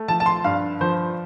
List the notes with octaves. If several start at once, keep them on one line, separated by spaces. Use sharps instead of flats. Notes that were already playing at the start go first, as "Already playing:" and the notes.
Already playing: A3
F3 A5
A5
C6
G2 F5
F3 C5